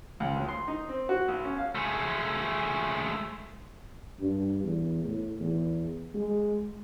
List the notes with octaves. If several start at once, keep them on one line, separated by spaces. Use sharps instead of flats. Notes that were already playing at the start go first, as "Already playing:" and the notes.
C#2
D2
C6
D#4
C4
F#4
B1
C#4
F5
G#3 A3
G2
E2
A2
E2
G#3